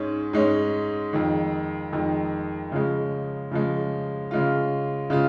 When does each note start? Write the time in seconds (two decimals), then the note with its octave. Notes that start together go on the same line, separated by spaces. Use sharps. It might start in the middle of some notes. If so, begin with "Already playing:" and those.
Already playing: G#2 G#3 C#4
0.33 G#2 G#3 C#4
1.13 F2 D#3 G#3
1.93 F2 D#3 G#3
2.72 C#3 F3 G#3
3.52 C#3 F3 G#3
4.31 C#3 G#3 F4
5.10 C#3 G#3 F4